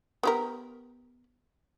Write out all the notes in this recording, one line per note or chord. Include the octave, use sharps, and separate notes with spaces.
B3 G4 A#4